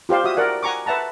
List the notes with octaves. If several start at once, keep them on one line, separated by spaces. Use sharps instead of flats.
F4 G4 C5 F5
F#4 E5 D#6
A#4 D5 F#5
F#5 G#5 A#5 C#6 D6
B4 E5 F#5 A5 A#5